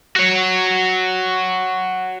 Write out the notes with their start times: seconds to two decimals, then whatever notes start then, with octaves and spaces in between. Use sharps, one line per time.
0.16 F#4 C#5